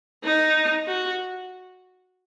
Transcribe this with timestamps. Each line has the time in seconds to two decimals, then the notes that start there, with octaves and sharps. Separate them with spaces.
0.24 D#4
0.87 F#4